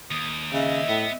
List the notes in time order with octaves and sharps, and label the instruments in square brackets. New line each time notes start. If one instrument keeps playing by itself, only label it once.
[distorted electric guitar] D#2 [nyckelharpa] D#6
[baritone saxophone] C#3 [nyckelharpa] D#5 [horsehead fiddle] E5
[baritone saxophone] A2 [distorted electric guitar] B3